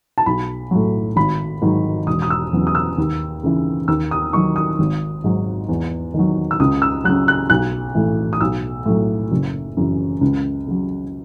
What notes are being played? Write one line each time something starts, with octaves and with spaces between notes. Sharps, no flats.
A5
B1 B5
A2 F#3
G#1 B5
G#2 D#3 F#3
E1 D#6
D#6
E6
E2 C#3 F#3
D#6
E6
D#2
C#3 E3
D#2 E6
D#6
D#3 F#3 C#6
D#6
G#1
G#2 F#3
E2
D#3 F#3
E6
C#2 D#6
E6
C#3 F#3 F#6
F#6
B1 F#6
A2 E3
D#6
B1 E6
A2 F#3
F#1
F#2 C#3 E3
C#2
C#3 F#3